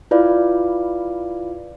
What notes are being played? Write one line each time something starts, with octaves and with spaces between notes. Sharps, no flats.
E4 F4 B4 D5 F5